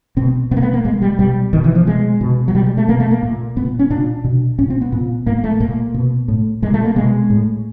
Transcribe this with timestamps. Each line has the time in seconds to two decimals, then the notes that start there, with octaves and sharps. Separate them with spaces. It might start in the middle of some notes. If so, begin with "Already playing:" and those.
0.17 B2 C4
0.51 B2 B3
0.57 A#3
0.62 B3
0.73 A#3
0.85 A#2 G#3
1.02 G3
1.19 B2 G3
1.53 B2 D#3
1.64 E3
1.75 F3
1.87 B2 G#3
2.21 B2
2.48 F#3
2.54 B2 G3
2.66 G#3
2.77 A3
2.88 B2 A#3
3.00 A3
3.11 A#3
3.23 A#2
3.56 A#2 B3
3.79 C#4
3.90 A#2 D4
4.24 B2
4.58 A#2 C#4
4.70 C4
4.81 B3
4.92 A#2
5.26 A2 A#3
5.44 A3
5.60 A#2 A#3
5.94 B2
6.28 A2
6.62 A#2 G#3
6.74 A3
6.85 A#3
6.96 B2 G#3
7.30 A2